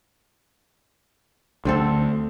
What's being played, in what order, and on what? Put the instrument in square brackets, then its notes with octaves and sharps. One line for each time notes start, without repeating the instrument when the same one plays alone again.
[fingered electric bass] D2 [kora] D3 C4 A4